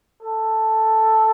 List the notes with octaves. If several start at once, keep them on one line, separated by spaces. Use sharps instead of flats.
A4